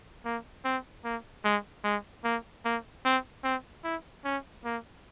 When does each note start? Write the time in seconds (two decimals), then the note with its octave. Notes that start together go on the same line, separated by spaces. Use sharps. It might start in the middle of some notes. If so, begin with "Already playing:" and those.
0.25 A#3
0.65 C4
1.04 A#3
1.45 G#3
1.84 G#3
2.24 A#3
2.65 A#3
3.05 C4
3.44 C4
3.84 E4
4.25 C#4
4.65 A#3